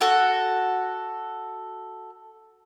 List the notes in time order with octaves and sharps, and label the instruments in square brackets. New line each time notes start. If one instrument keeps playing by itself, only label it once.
[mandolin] F#4 A4 F#5